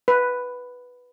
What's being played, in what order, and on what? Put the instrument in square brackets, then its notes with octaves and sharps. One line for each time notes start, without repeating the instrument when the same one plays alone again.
[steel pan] B4